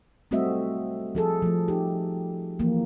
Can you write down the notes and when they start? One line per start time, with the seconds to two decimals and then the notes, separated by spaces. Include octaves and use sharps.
0.31 G3 A3 C4 F#4 D#5 E5
1.15 F3 G#4 A4
1.42 F3 A3
1.68 D#4 G4
2.59 E3 F3 A#3